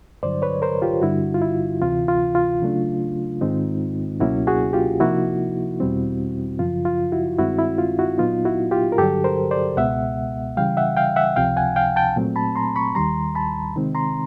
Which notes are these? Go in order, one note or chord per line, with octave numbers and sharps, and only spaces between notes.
G2 D3 F#3 C5 D5
B4 C#5
A#4 C5
F4 G4
G2 D3 G3 E4 F#4
F4
E4
D2 C3 E3 F4
F4
F4
C#3 F#3 A3 D4
G#2 D#3 G#3 C4 D#4
C#2 B2 F#3 A#3 C#4 E4 F#4
F#4 G#4
F4 G4
C3 F3 A#3 D#4 E4 F#4
E2 B2 G3 C4
F#2 C#3 F3 F4
F4
E4 F#4
G2 D#3 G#3 C4 E4 F#4
E4
F4
E4 F#4
A#2 F#3 B3 D#4 F4
E4 F#4
F4 G4
A#4
G2 D3 F#3 G4 A4
A#4 C5
C5 D5
C#2 B2 G#3 B3 E5 F#5
C#3 E3 G3 F5 G5
E5 F#5
F5 G5
E5 F#5
C#2 C3 F3 F5 G5
F#5 G#5
F5 G5
G5 A5
A#2 F#3 A3 C4
A5 B5
A#5 C6
B5 C#6
D#2 D#3 G3 A#5 C6
A5 B5
C3 D#3 G#3 C4 D#4
A#5 C6